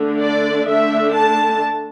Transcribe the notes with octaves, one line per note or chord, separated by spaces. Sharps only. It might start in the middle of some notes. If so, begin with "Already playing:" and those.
Already playing: D3 A3 D4
D5
D3 A3 D4 E5
A5